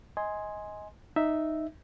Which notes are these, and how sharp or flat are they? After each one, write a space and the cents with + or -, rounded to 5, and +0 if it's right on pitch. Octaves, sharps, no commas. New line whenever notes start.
D#5 +20 G#5 +0 C6 +0
D#4 -5 E5 -5